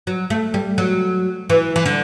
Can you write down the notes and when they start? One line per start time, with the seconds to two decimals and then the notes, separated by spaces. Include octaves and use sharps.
0.07 F#3
0.30 A3
0.54 G3
0.78 F#3
1.50 E3
1.76 E3
1.86 D3